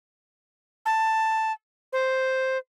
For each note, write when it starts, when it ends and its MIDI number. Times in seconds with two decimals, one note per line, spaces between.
0.86 1.52 81
1.93 2.58 72